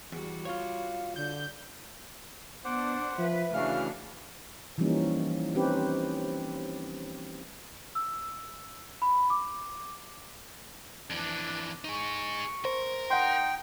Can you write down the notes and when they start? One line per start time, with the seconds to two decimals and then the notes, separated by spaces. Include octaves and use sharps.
0.12 E2 G3 F#4
0.45 F4 C#5 F5
1.16 D3 G6
2.65 B3 D4 C5 F#5 D6
3.18 F3 B4 E5
3.54 C#3 E3 A3 D4 F#4 F5 F6
4.78 E3 F3 G3 A#3 C#4 D#4
5.55 C4 C#4 D#4 G4 B4
7.95 E6
9.02 B5
9.30 D6
11.10 F2 E3 D4
11.84 D#4 G#4 C#6
12.65 A#4 C5
13.10 D#4 F#5 G5 C6